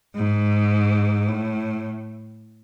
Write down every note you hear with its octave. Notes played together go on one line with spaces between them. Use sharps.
G#2
A2